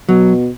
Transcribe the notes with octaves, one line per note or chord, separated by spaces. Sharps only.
B2 F#3